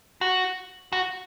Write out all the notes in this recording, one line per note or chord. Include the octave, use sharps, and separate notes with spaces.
F#4
F#4